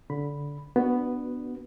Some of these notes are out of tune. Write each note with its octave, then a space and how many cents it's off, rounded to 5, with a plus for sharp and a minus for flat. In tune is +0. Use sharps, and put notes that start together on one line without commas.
D3 -20 B5 +0
B3 +0 D4 +0 F#4 +0